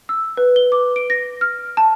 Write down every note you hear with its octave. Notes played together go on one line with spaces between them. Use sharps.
E6
B4
G7
D6
D7
A#6
F6
A5